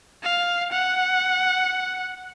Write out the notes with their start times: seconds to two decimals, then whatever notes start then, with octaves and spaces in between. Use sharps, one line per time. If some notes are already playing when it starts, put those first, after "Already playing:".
0.24 F5
0.72 F#5